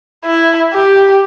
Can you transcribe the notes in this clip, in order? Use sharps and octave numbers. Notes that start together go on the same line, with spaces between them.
E4
G4